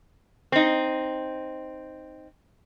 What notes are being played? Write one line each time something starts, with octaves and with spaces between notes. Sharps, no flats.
C4 D#4